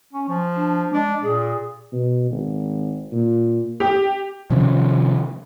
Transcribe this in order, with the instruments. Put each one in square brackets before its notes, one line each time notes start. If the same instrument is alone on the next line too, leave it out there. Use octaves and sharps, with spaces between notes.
[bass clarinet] C#4
F3
[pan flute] D4
[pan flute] G#3 [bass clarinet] D4
[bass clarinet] A#2 [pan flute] G#4
[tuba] B2
G#1
A#2
[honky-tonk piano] G4
[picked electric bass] C3 D#3 F3 C#4